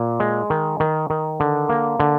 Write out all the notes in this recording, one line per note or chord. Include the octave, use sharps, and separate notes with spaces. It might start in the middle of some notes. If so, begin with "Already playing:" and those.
Already playing: A#2
G#3
D#3
D#3
D#3
D3
A#3
D3